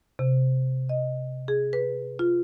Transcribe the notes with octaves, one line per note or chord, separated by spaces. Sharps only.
C3
D#5
G#4
B4
F4